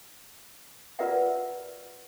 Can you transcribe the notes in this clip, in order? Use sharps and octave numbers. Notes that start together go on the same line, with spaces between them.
F4 A#4 B4 D5 E5 F#5